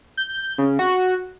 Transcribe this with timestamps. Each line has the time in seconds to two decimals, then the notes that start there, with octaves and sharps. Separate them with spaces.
0.17 G6
0.58 C#3
0.79 F#4